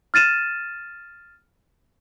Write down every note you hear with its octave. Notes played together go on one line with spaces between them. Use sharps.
F6 A6 D#7 E7